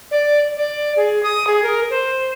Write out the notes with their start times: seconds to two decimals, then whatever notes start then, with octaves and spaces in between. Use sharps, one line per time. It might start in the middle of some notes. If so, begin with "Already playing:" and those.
0.11 D5
0.57 D5
0.96 G#4
1.23 D#6
1.47 G#4
1.63 A#4
1.90 C5